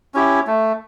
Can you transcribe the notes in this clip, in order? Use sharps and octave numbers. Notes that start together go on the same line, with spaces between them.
C#4 E4 G4
A3